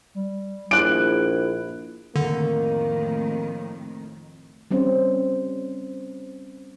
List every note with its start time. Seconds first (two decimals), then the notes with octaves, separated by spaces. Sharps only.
0.15 G3
0.71 A#1 E4 F#6 D7
2.16 F2 A2 D3 D#3 A#3
4.71 G3 C4 C#4 C5